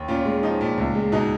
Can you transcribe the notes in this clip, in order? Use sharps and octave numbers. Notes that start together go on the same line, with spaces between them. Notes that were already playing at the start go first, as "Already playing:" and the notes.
Already playing: D#2
A#2 C#4 F4
G#3
F3 D#4
A#2
C#2
G#3
B2 D#4